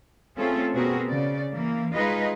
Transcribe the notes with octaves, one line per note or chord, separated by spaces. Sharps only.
A3 C4 C#4 F4 G#4 A4
B2 B3 C4 F#4 G#4 A#4
C#3 D5
E3 A#3
G#3 D#4 F4 G#4 B4 D#5